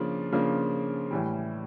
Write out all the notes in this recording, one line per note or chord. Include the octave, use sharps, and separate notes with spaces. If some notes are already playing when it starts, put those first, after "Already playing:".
Already playing: C#3 F3 A#3 D4 F4
C#3 F3 A#3 D4 F4
A2 E3 G3